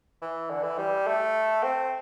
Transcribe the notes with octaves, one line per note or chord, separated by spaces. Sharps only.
E3
D3
E3
G3
A3
C4